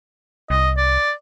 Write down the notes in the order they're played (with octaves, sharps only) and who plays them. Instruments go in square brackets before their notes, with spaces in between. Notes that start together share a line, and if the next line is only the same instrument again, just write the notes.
[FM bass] C2 [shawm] D#5
[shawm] D5